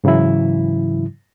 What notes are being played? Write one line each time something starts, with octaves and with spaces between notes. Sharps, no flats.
G#2 C#3 E3 F#3 E4